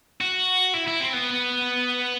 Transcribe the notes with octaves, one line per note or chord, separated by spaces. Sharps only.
F#4
E4
E4
C4
B3